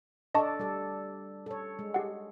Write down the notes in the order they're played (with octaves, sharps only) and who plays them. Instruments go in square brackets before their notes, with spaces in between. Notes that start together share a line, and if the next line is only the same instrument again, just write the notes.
[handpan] D4 A4 D5 [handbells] D#5 A5 C#6
[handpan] G3 A4
A4 C#5
G#3
[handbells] G4 F#5